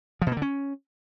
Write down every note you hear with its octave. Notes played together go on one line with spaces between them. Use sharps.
F3
B2
A#3
D3
C#4